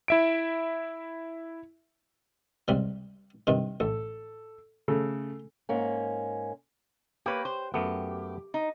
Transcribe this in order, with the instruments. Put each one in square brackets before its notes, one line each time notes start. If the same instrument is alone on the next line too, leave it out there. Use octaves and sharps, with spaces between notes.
[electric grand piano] E4 E5 D7
[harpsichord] C#2 C3 G3
G2 C3 D#3
[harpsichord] A1 [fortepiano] A4
[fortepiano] C#3 A3 A4
[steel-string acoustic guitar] G#2 A#3 C#4
[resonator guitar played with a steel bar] A#3 B4 [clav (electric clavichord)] G4 C#5
[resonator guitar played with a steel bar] C5
[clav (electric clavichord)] F#2 A3 B3 [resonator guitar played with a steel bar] G4
[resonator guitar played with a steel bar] D#4